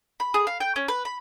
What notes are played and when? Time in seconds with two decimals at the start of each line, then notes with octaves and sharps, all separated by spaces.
0.20 B5
0.34 G#4
0.47 F5
0.60 G5
0.76 C#4
0.88 B4
1.05 B5